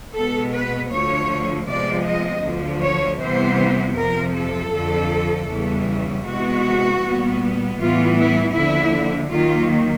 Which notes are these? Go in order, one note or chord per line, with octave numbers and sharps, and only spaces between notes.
B2 G#3 B3 A4
B4
D2 D3 F3 C#5
C3 F3 G#3 B3 D5
D#5
D2 D3 F3
C#5
C3 E3 G3 B3 C5
F2 C3 F3 A#4
A4
F2 D3 F3
E2 C#3 E3 G3 B3
C3 E3 G#3 B3 F#4
A#2 G3 B3
A2 E3 G3 B3 F4
E4
D#2 D3 F3 E4
D#2 D#3 F#3 A#3 F4